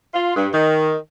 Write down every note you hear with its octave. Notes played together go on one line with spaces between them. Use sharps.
F4
G2
D#3